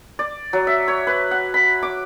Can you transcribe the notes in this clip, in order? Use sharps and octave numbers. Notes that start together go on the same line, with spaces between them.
D5
F#3
E5
C#5
B4
F#5
B5
D6